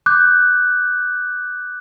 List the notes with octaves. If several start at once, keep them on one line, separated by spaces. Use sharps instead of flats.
D6 F#6 G6